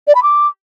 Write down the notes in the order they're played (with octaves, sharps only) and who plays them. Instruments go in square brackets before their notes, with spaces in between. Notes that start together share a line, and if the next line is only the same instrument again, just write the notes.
[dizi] D5
B5
D6